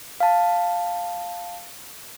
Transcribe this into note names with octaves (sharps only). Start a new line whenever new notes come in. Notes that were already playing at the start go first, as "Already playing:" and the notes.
F5 A5